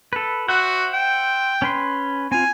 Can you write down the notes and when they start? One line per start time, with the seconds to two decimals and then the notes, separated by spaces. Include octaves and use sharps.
0.13 A4 B4
0.48 F#4 C5 E5 F#5
0.93 G5
1.62 C#4 B4 C6
2.32 C4 F4 G#5